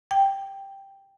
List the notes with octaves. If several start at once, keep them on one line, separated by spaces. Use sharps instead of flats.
G5